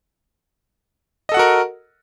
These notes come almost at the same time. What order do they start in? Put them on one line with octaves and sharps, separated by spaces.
D#5 A4 F#5 F#4 A#4